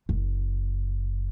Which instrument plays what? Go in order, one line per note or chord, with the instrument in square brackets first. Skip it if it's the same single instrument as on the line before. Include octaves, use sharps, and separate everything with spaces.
[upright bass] F#1